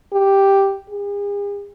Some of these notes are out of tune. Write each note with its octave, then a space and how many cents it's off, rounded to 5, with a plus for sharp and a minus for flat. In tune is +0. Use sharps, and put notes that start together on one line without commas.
G4 +0
G#4 -45